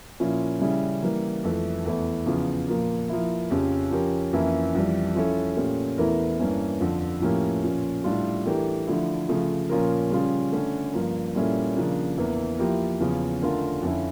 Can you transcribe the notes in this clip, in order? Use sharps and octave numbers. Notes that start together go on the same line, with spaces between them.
A#2 F3 C#4 E4
C#3 G3 C#4 E4
E3 G3 A#3
F2 E3 A3
E2 E3 A3 E4
E2 C#3 F3
A#2 F3 A#3
F3 A#3 E4
F2 C#3 F3 C#4 G4
F3 C#4 G4 A#4
F2 E3 A#3 C#4 E4
F2 E3 G3
F3 C#4 E4 A4
A#2 A3 C#4 G4
E2 E3 A3 E4 A#4
G2 E3 A#3 C#4
F2 D3 F3
A2 F3 A#3 C#4 G4
A#2 F3 C#4
A2 G3 D4 F4
E3 A3 D4 G4 A#4
D3 F3 A3 E4
C#3 F3 A3
A#2 F3 C#4 F4 A#4
C#3 G3 C#4 F4
D3 A3 C#4
G2 F3 A#3
A#2 G3 C#4 E4 A4
C#3 F3 A#3 D4
E2 E3 A#3
F3 A#3 E4 G4 A#4
E2 C#3 F3 C#4
D3 A3 C#4 F4 A#4
F2 D3 F3 C#4 E4